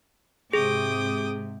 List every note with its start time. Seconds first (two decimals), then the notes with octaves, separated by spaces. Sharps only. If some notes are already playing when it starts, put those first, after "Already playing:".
0.53 G#2 C3 G#4 G5 D6 D#6